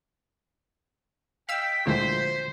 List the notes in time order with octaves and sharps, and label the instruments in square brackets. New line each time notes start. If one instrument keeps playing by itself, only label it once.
[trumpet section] D#5 G5 [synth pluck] F5 E6 [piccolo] B6
[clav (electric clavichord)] D2 F3 E5 [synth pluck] A#2 E3 G#3 [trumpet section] C5